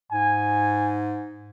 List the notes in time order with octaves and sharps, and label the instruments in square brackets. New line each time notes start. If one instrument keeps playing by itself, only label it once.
[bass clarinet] G#2 [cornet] G#5